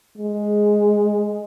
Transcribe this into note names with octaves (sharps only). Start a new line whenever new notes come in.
G#3